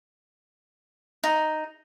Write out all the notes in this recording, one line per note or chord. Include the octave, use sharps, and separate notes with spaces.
D#4